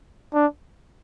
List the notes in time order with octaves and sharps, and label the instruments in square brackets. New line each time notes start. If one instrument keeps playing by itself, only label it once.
[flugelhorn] D4